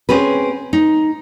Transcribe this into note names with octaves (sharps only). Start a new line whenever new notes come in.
C4 C#4 G#4 B4
D#4